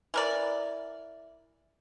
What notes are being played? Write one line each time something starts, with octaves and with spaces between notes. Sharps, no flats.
E3 A#4 D5